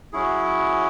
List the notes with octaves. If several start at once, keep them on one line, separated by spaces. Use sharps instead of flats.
F#3 C#4 E4 G#4